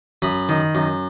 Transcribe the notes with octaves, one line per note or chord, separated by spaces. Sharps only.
F#2 B5 D#6
D#3
F#2